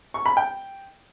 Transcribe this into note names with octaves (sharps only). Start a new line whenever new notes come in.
C#6
B5
G5